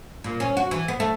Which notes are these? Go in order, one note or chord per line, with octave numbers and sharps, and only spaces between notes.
A#2
C#4
F#4
E3
B3
A3